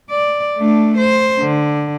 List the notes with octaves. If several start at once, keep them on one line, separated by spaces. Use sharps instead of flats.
D5
A3 D4
C5
D3